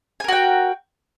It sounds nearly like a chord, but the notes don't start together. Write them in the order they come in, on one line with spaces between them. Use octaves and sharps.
G#5 A#4 F#4 G5